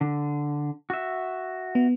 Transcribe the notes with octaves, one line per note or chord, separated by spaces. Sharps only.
D3
F#4 E5
B3